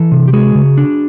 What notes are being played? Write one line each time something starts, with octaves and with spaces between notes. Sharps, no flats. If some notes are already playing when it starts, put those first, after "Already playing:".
Already playing: E3 A4
C3
G4
G#3 F#4 G#4
C#3
D4